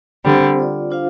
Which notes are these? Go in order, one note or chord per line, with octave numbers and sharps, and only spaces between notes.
D3 G3 C4 G4 C5
D4 F4 D5
D4 F4 C5 F5